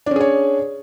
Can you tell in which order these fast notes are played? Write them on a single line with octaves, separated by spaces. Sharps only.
D4 C#4 G#4 C#5